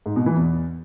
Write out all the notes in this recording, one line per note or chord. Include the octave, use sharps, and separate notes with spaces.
G#2
B2
E3
E2